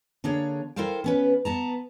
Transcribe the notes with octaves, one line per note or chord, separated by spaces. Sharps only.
D3 A#3 D4 G#4 C#5
E4 A4 A#4 C5 F5 G5
B3 C#4 B4
B3 A5 A#5